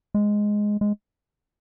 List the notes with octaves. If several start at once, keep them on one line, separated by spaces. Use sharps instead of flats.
G#3
G#3